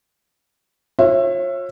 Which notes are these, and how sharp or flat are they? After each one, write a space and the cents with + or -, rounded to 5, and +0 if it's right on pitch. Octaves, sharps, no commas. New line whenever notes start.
F4 +40 C#5 -35 E5 +20